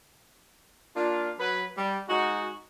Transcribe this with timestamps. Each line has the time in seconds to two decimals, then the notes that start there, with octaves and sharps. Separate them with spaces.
0.97 A#3 D4 F4
1.39 F#3 B4
1.77 G3
2.09 G#3 D#4 F#4